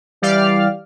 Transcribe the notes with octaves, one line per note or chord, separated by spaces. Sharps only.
E3 G3 G4 D5 F5 F6